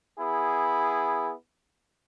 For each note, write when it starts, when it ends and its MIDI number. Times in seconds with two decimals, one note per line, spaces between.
0.19 1.32 59
0.19 1.32 64
0.19 1.32 68